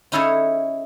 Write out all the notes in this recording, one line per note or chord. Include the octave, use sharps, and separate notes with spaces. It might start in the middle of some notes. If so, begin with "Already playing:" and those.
C#4 D#4 E4 G#4 A4 C#5